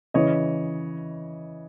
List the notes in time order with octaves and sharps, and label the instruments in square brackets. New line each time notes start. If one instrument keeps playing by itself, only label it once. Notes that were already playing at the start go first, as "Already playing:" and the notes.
[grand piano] C#3 E3 C#5 D#5